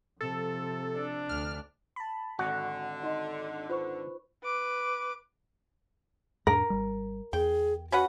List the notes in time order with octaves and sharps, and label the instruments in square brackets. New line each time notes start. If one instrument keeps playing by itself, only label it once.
[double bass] C3 F3 [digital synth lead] A4
[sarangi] D4
[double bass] D2 [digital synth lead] F6
[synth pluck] A5 B5
[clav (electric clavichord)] G#1 F#4 F#5 [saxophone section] D3
[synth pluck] D#4 [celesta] D#5 C6
[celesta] F4 C5 C#6 [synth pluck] B4
[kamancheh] B4 D6
[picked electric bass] F2 A2 D4 [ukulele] A#4
[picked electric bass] G#1 G3
[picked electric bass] E2 [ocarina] G#4 [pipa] G5
[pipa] C#4 B4 F#5 [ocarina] F#4